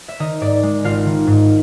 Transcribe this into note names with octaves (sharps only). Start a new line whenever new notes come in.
E5
D#3 D#4 D#5
G#2 D5
G#3
G#1 F4 F5
D#3
G#2